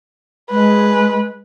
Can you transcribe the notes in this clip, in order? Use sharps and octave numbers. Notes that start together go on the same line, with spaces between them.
G#3 B4